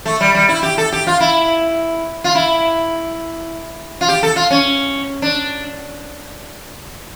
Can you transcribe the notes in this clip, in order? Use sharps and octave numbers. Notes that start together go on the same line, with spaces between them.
A3
G3
G3
E4
G4
A4
G4
F4
E4
F4
E4
F4
G4
A4
F4
C#4
D4